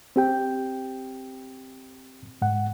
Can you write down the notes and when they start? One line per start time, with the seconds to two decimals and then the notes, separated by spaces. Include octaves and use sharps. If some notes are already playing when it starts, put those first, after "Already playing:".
0.16 C4 G4 G5
2.42 G#2 F#5